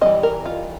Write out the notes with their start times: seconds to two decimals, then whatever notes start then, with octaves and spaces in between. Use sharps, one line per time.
0.01 E3 G3 A#3 D#5
0.23 A#4
0.46 F4